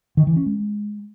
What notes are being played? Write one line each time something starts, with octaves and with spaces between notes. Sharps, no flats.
D#3
E3
C#4
G#3